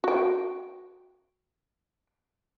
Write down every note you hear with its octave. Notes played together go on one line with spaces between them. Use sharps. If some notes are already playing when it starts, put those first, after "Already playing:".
F#4 G5